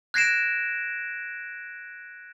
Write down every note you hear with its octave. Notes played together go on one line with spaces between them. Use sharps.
F#6 G#6 A#6 C7 D7 E7